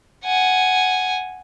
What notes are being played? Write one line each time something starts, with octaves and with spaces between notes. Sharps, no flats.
F#5 G#5